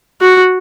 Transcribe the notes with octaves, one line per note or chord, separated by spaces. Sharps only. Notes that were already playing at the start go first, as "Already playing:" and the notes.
F#4